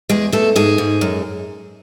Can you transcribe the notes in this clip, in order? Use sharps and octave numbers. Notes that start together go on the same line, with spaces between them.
E2 G#3 G#4
E2 A3 A4
G#2 G#3 G#4
G#2
F#2